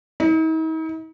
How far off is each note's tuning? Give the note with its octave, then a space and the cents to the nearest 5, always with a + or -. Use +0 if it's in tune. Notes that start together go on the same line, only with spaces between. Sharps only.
D#4 +45